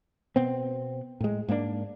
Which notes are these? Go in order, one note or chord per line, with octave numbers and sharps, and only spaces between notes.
B2 B3 C4
A2 G#3
G#2 A#3 B3 D4